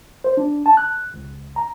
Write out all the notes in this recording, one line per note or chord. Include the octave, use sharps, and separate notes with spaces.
C5
D4
A5
F#6
C#2
A#5